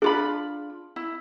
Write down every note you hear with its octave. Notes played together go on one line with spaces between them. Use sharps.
D4 F4 G#4 B5
E4